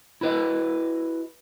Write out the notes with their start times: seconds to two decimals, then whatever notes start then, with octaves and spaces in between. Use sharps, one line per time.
0.21 E4 F#4 B4 D#5